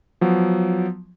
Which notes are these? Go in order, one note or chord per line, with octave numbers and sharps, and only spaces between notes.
F3 F#3 B3